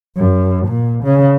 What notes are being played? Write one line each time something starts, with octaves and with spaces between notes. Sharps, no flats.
F#2
A#2
C#3